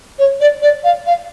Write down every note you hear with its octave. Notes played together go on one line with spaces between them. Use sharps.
C#5
D5
D5
F5
F5